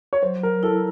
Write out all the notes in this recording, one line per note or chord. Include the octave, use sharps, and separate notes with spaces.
C#5
F#3 C5
A#4
E4 A4